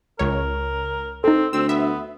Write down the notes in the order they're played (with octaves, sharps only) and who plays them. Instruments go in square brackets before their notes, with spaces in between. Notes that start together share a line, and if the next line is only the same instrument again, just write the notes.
[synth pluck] C#2 C#5 [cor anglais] A#4
[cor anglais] C4 [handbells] D#4 A4
[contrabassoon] D2 [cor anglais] C4 [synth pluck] E6
[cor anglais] B3 [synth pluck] E5